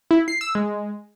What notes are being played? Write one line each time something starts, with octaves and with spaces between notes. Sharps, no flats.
E4
C7
E6
G#3